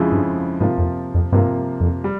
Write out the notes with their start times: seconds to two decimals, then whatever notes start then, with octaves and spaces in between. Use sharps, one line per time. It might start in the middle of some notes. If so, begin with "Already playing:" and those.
Already playing: F2 C#3 F3 G#3 E4
0.12 G2
0.60 G#2 C3 F3 A#3 F4
0.78 F2
1.15 F2
1.32 G2 C3 F3 A#3 F4
1.81 F2
2.04 G3